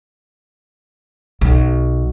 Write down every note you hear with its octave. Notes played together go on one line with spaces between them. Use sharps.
B1